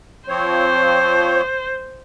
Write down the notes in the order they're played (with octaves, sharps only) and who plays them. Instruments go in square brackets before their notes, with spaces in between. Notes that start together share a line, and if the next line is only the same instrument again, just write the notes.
[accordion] F3 C4 C#5 [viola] C5